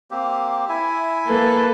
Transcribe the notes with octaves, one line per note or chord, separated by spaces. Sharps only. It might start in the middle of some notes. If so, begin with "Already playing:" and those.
A#3 C4 G4
E4 E5 G#5
A#3 A4 B4